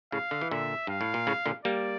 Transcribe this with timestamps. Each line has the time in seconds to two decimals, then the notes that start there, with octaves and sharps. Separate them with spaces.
0.12 A2 C#3 F5
0.31 D3
0.41 E3
0.51 A#2 D3 E5
0.87 G2 F5
1.01 A2
1.14 A#2
1.27 A2 C#3
1.46 A#2 D3
1.65 G3 A#3 D5